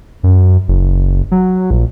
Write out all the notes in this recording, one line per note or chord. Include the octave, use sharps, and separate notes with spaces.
F#2
F#1
F#3
A#1